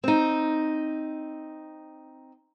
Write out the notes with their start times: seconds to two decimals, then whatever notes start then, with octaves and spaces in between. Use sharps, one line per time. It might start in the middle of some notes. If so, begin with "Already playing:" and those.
0.04 C4 D#4